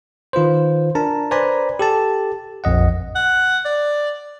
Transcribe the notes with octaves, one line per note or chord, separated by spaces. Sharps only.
D#3 F4 B4 C5
D4 A#4 A5 A#5
B4 C5 D5 G#5 A#5 B5
G4 A4 A5
A#1 F2 D#5 F#5
F#5
D5